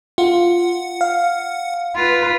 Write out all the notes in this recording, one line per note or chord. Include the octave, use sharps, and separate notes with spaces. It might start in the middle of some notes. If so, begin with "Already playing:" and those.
F4 F#5
F5
F4 B4